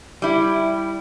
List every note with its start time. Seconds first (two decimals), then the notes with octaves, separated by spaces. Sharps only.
0.22 G3 E4